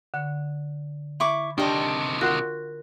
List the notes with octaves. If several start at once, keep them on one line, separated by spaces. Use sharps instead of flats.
D3 F#5
E4 C#6 D6
C3 D#3 D4 G4 D#5 A5
F4 F#4 A#4 C6 F#6